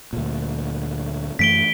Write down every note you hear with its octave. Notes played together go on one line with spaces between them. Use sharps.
D2 A#2
F#2 E3 A3 B6 D7 G7